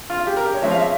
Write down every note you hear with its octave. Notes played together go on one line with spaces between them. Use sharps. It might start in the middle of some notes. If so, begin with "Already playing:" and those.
F4
G4
A#4
G4
C#5
F3 G#3 C#4 E5
F5
E5